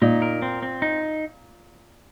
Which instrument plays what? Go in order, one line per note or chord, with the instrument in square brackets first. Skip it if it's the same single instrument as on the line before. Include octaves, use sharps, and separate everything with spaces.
[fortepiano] A#2 [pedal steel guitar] D#4
[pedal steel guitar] A#4
C4
C4
D#4